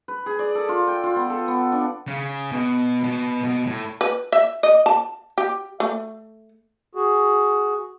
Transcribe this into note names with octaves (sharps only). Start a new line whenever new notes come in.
B4
G#4
D5
A4
F4
G5
F4
B3
A4
B3
D4
C#3
B2
B2
B2
A2
B4
E5
D#5
A5
G4
A3
F#4 G#4